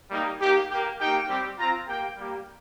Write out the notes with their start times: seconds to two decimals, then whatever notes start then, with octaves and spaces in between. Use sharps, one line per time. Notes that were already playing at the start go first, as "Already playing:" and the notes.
0.10 G3 A#3 D#4 G4
0.40 A#3 D#4 G4
0.69 G4
0.74 A#3
0.99 A#3 D#4 G4 G5
1.29 G3 C4 G4
1.58 C4 F4 A#5
1.88 A#3 G4 G5
2.17 G3 A#3 G4